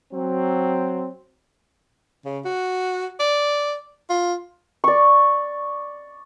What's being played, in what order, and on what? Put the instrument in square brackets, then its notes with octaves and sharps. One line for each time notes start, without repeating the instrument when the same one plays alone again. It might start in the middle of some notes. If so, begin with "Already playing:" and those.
[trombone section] F#3 C4
[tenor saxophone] C#3
F#4
D5
F4
[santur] D5 C#6